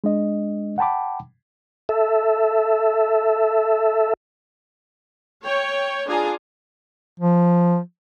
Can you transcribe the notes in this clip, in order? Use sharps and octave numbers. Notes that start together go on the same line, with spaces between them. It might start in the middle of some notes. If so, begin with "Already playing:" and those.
G#3 D4 D#5
F#5 G5 A5 B5 D6
A4 E5
C#5 G5
D4 F4 G#4 G#5 A#5
F3